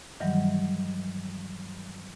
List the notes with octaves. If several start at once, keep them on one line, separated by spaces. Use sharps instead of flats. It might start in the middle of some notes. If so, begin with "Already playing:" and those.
G2 D#3 E3 F#3 G3